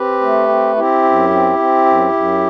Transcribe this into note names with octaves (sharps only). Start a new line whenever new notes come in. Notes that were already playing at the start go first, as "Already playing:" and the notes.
Already playing: C4 G4 B4
A3
C4
C4 E4 G4
F#2
C4
C4
F#2
F#2